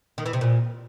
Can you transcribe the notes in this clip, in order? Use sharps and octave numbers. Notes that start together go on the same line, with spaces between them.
D#3
E3
C3
A#2